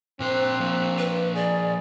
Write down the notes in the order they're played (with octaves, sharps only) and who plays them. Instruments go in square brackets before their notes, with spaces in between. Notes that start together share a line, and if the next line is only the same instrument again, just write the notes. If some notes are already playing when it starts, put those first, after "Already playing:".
[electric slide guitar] A#2 C5 [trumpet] C4 [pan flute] F#6
[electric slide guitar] F3 A#3
[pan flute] B4
[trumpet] G#4 [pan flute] D5